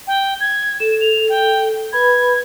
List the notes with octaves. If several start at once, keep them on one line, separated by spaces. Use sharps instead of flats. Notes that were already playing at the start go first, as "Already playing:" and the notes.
G5
G#6
A4 E7
F7
G5
B4 B5 G#6